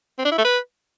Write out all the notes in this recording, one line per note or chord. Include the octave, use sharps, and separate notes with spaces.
C4
D4
E4
A3
B4